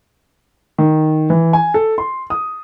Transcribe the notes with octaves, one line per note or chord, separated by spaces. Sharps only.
D#3
E3
G#5
A4
C6
D#6